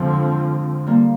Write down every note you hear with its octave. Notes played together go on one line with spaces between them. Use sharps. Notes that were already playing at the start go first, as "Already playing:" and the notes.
Already playing: F2 D3 F3 G#3 C4
G3 A#3